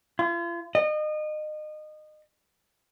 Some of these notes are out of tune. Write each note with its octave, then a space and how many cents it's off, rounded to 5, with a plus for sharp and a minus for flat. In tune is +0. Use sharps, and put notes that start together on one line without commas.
F4 -40
D#5 -30